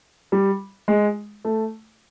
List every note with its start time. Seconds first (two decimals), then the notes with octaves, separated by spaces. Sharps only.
0.32 G3
0.88 G#3
1.45 A3